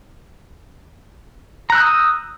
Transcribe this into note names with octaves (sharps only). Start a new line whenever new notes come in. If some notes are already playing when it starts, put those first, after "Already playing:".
A#5 D#6 E6 F#6 G6